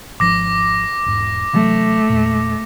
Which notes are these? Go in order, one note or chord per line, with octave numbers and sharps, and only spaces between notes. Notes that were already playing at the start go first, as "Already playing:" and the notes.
G#1 F3 D4 D6 A#6
E1 G#2
C3 E3 F#3 A3
E2 A#2